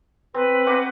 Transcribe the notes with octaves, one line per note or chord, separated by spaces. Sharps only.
C4 B4
C4 F#5 D6